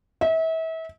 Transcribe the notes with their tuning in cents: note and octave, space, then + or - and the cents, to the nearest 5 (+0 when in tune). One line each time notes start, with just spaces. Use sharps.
E5 -35